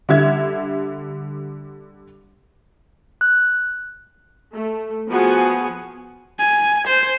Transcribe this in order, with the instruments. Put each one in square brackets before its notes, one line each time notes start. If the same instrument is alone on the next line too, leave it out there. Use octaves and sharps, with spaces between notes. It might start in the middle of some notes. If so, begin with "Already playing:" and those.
[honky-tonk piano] D3 G3 E5 G#6
[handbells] F#6
[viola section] A3
F3 B3 F#4 G#4 F#5 G#5
[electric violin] G#5
C5